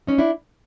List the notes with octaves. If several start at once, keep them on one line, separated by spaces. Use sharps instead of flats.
C#4 D#4
D4 E4